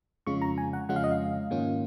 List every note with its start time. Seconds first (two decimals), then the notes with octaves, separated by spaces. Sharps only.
0.26 F2 C#3 G#3 C#4 F4 C#6
0.42 A#5
0.58 G#5
0.73 F#5
0.89 F2 C#3 G#3 C#4 F4 F#5
0.96 F5
1.04 D#5
1.11 F5
1.50 G#2 D#3 A#3 C#4 F4